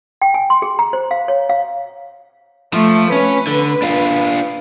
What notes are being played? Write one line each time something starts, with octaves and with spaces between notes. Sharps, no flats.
G5
G#5
C6
G#4
A#5
C5
F5
C#5
F5
F3 A3
C#4 B4 C#5
D3
D4 F4